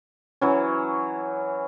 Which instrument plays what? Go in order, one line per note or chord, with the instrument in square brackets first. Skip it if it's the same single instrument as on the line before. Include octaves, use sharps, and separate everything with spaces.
[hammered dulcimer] E3 F#3 C#4